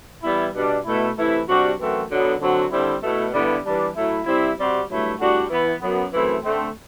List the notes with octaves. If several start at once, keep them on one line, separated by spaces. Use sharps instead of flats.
E3 G3 B3 E4
B2 G3 D4
B2 A3 E4
C3 E3 A3 E4
C3 G3 D4 F#4
F#2 E3 A3 C4 F#4
D3 F#3 B3
D3 F#3 C4 F#4
D3 G3 C4 E4
B2 A3 E4
G2 D3 G3 B3 E4
E3 G3 D4
A2 F#3 A3 E4
C3 G3 C4 E4
C3 G3 C4 F#4
G2 F#3 A3 E4
A2 G3 D4 F#4
E3 B3 E4
F#2 F#3 B3
F#2 E3 A3 C4 E4
D3 A3 C4